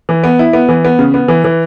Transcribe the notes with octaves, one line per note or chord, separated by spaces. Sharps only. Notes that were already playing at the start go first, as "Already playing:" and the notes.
E3
B3
E4
B3
E3
B3
C#3
B3
E3
E3